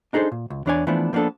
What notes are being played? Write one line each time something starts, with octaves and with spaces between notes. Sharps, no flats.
D4 D#4 G#4 A4 C5
A#2
C#2
E2 E3 D4 C#5 D5 G#5
E3 F3 A3 B3 D4
F3 A#3 B3 D4 A4